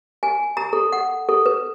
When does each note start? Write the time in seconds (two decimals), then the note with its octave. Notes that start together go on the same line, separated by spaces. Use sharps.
0.23 G#5
0.57 A#5
0.73 A4
0.92 F#5
1.29 A4
1.46 B4